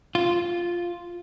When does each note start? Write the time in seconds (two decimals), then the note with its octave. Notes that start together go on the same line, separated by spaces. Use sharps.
0.15 F4